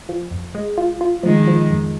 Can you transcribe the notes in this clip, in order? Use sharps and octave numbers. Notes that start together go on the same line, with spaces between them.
F3
F2
G#3
F4
F4
D#3 F3 G#3
F3
F2